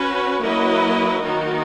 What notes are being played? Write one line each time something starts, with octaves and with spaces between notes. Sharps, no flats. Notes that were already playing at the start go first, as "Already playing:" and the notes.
Already playing: C#4 F#4 B4
F#3 A#3 E4 B4 D#5
D#3 A#3 D#4 F#4